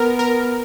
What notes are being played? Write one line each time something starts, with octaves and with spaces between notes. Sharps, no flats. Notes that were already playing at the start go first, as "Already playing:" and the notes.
Already playing: B3 A#4
A#4